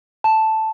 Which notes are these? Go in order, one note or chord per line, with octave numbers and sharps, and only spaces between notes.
A5